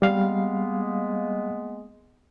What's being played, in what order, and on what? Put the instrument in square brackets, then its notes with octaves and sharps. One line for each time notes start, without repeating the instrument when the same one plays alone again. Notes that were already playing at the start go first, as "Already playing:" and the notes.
[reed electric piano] G3 F5 [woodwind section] G#3 A#3 B3